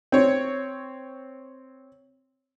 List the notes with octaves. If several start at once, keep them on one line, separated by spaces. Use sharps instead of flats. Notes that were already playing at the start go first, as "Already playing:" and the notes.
C4 C#5